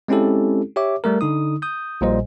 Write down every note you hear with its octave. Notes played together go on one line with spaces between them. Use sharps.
G#3 C4 C#4 E4 G4 A4
G4 C#5 E5 D6
G3 A3 A#4
D3 D#4 D#6
D#6 G6
A#1 A#2 G3 C5 D#5